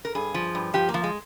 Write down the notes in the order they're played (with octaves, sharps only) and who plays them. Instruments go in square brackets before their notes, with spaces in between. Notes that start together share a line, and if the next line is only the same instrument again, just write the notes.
[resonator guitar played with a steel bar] A#4
G2 G#4
F3
G2
F3 G4
A#3
F3
G#3